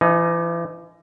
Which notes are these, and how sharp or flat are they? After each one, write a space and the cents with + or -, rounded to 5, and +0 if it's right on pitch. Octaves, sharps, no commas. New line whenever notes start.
E3 +40 D#4 +0